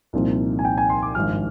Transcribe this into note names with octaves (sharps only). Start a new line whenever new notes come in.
C2 A#2 F3 C4 D#4
G#5
G5
G#5
C6
D6
G#1 G2 F3 F6